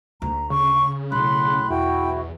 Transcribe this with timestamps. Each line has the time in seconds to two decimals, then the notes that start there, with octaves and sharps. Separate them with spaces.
0.22 D2 A#5
0.50 C#3 C#6
1.12 B1 A2 B5 C6 F#6
1.70 E2 E4 F#4 G5